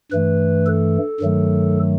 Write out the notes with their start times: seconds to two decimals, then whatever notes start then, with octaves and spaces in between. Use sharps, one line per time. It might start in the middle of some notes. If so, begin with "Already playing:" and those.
0.12 G2 E3 A3 B4
0.66 A4
1.20 G2 D#3 F#3 A3